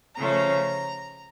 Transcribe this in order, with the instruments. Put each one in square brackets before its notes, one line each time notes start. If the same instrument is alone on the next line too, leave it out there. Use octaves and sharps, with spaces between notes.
[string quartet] C#3 F3 A3 C#4 A#5